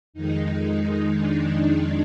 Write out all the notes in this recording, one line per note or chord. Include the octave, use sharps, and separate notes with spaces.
F2 D#3 G#3 D#4
D4
D#4